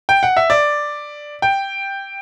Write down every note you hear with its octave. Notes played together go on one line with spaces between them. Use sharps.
G5
F#5
E5
D5
G5